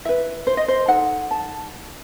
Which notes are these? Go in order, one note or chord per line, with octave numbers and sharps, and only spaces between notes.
E4 B4 E5
C5
D#5
C5
D#4 A4 F#5
A5